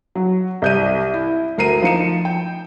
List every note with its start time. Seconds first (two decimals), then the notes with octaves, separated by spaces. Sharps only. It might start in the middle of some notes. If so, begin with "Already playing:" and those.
0.15 F#3
0.62 C2 G6 D#7
1.14 E4
1.58 D2 A#4 C7 D#7
1.82 F3 D#4 C#7 E7
2.25 G5